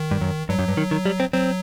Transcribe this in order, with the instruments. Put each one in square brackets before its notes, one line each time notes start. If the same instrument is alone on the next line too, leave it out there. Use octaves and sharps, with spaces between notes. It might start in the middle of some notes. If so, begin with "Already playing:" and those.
Already playing: [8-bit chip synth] D#3
[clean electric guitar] G2
F#2
[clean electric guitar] G2 [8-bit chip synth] F#3
[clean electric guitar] F#2
G2
D#3
D#3
G3
C4
[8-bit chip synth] F#3 [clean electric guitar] C4